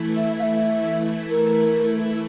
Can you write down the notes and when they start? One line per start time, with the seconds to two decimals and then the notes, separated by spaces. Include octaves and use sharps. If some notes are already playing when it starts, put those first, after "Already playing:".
Already playing: E3 A3 E4
0.17 E5
0.39 F5
0.43 E5
1.30 A#4